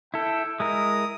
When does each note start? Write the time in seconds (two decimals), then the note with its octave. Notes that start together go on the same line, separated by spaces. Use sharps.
0.14 E4 A4 G5
0.60 G#3 E4 A#4 D#6